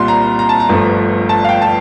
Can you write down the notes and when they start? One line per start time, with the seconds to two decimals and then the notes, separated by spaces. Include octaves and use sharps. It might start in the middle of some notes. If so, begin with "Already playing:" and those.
Already playing: C2 A#2 G3 C6
0.08 A#5
0.39 A#5
0.49 A5
0.60 A#5
0.69 G1 G2 F3 A3
1.29 A5
1.45 F5
1.49 G5
1.62 A5